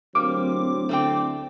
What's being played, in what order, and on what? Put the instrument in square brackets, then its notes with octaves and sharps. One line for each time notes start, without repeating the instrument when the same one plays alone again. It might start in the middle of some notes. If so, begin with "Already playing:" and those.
[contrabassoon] D1 [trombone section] F#3 C4 [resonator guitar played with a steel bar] G3 A#3 [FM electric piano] D6
[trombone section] D3 [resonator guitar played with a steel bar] A3 C4 G5